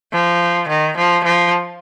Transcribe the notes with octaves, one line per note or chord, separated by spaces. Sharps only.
F3
D#3
F3
F3